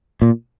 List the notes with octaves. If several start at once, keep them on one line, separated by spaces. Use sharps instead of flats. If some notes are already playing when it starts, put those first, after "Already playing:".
A#2